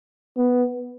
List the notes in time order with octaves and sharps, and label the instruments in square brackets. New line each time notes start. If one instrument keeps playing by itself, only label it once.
[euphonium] B3